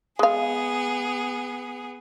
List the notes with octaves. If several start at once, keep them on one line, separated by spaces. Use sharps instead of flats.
G#3 B3 G#4 F5